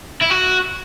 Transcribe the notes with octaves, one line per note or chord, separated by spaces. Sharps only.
E4
F#4